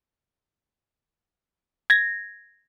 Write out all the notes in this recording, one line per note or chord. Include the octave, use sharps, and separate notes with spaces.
G#6 A#6